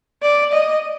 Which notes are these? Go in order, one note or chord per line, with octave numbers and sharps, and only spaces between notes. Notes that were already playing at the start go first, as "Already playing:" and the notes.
D5
D#5